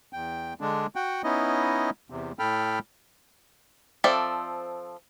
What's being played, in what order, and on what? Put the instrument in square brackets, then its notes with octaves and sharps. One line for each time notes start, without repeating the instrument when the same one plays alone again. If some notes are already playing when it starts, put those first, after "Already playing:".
[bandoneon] E2 G5
D3 G#3 D4
F#4 F#5 G5
B3 C#4 D#4 E4 D#5
E2 C3
A2 A4 G5 B5 F6
[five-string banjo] F3 C4 A4 D5 E5